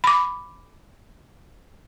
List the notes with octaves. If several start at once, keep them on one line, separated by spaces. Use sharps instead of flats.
B5 D6